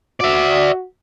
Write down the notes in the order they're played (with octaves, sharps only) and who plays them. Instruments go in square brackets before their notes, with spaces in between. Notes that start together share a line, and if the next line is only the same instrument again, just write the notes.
[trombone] F#4 [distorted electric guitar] D5 E5